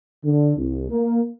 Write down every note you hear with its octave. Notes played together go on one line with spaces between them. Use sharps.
D3
C2
A#3